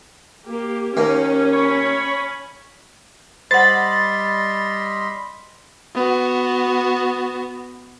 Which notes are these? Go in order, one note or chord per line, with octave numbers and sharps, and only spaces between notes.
A#3 G4
D#2 A#3 C#4
C#5 B5
G3 C5 D#5 F#5 B5 C6 A6
B3 F#4